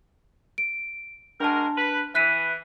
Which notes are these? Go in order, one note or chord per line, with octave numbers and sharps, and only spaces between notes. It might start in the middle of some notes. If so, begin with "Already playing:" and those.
D7
G#3 D4 F#4 A#4 A5
B4
E3 F#6 B6 D#7